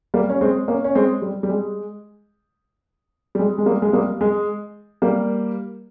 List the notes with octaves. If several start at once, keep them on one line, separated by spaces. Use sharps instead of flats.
G3 A#3
C#4
G#3 C4
A#3 C#4
C#4
G#3 C4
G3
G3
G#3
G3
G#3
G#3
G3 A#3
G#3
G3 A#3
G#3
G3 A#3